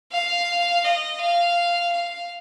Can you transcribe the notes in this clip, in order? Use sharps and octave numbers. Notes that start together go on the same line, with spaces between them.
F5
D#5
F5
F5